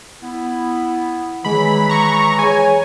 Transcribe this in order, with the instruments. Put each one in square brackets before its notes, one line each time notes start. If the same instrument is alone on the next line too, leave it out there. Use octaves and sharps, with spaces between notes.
[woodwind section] B3 E4
[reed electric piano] D#3 G#3 [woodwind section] E3 F#3 [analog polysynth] B5
[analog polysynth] A#5 C#6
[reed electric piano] G#4 C#5 [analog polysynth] G#5